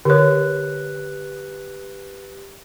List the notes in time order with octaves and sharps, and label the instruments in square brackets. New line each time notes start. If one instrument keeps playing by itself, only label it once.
[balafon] D3 C#5 [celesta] G4 B4 F#6